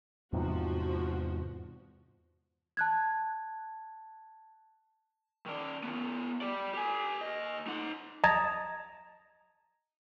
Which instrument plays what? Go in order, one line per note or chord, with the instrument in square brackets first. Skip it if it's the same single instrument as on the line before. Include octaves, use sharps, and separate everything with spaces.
[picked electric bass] E2 G#2 C3 [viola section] F3 F#4
[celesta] A5 F#6 G#6
[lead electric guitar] D#3 D5
D#3 B3
G4 D5
G4 G#5
D#2 D#5
D#4 F#5
[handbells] D#5 A5 A#5 D#6 G#6 A6